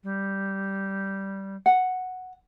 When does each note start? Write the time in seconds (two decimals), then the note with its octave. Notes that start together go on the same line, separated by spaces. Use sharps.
0.04 G3
1.66 F#5